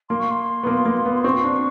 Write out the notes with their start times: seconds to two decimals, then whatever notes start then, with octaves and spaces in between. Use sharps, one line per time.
0.09 A#3 C6
0.19 C#6
0.30 C6
0.63 B3
0.67 A#3
0.85 A#3
1.06 B3
1.15 C6
1.24 C4 C#6
1.44 D4